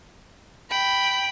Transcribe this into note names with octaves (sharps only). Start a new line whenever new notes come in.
G5 B5